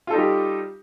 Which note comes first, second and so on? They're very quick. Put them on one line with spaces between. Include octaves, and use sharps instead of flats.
F4 A4 D#4 G3 G4